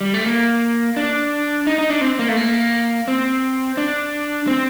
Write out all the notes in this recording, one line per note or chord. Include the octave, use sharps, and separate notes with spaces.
G3
A3
A#3
D4
D#4
D#4
D4
C4
A#3
A3
A#3
C4
D4
C4